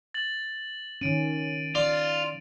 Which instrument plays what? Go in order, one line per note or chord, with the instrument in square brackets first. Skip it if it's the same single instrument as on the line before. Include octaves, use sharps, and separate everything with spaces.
[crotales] A6 F#7
[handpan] D#3 C#4 [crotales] D7 D#7
[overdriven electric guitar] F4 [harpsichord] D5